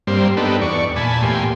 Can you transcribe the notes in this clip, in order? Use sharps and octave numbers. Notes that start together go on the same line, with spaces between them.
G2 G3 A#3 C4 C6
B3 D4 D#4 G4 A4 B4
E2 D5 C#6
A#2 G#5 A5 B5
E2 A2 A#3 G4 G#5 C6